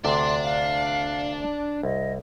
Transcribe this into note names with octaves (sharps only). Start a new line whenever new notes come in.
D2 C3 D4 C6
F5
C2 D#5